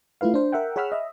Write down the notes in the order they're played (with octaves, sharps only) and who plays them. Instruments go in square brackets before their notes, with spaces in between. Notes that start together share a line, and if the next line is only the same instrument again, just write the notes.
[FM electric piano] A3 E4 F4 B4 F5
D4 C5
A#4 E5 F#5 G5
G#4 C#5 F#5 B5 E6 F6
D#5 E5